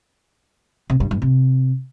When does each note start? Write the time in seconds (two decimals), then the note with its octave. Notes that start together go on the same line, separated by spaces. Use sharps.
0.90 C3
1.00 G2
1.11 G2
1.22 C3